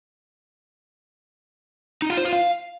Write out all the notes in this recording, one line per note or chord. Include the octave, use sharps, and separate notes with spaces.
D#4
F4
C5
F4
F5